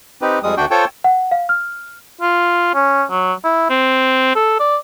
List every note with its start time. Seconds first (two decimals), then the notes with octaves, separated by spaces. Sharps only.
0.22 C4 D#4 G4 B4
0.43 F2 G3 G#3 D#6
0.57 D2 D4 F#4 G5
0.71 F4 A4 C5 C#5 G5
1.04 F#5
1.31 F5
1.49 F6
2.21 F4
2.74 C#4
3.10 F#3
3.44 E4
3.70 C4
4.35 A4
4.60 D5